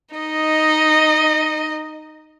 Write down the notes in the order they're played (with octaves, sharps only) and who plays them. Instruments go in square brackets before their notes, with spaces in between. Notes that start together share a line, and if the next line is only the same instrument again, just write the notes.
[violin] D#4 D#5